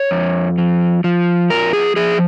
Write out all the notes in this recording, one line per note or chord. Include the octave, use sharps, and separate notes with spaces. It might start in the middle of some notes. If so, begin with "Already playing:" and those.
Already playing: C#5
F2
F3
F3
F2 A#4
G#4
F3 G#4